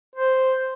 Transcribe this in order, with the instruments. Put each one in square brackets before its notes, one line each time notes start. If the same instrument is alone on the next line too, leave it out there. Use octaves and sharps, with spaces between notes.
[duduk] C5